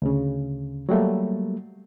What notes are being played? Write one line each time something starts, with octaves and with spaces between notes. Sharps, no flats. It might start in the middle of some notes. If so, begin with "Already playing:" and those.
D2 C#3
F#3 G3 A3 A#3